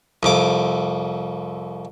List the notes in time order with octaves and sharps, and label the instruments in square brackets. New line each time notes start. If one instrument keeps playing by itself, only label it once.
[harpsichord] C2 F2 D6